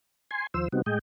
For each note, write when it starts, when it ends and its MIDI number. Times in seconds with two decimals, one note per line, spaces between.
0.31 0.47 80
0.31 0.47 84
0.54 0.68 39
0.54 0.68 53
0.54 0.68 72
0.54 0.68 88
0.72 0.82 48
0.72 0.82 55
0.72 0.82 59
0.72 0.82 60
0.72 0.82 63
0.72 0.82 66
0.86 0.99 45
0.86 0.99 56
0.86 0.99 68
0.86 0.99 75
0.86 0.99 79